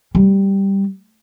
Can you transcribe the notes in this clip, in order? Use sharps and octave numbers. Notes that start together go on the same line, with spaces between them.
G3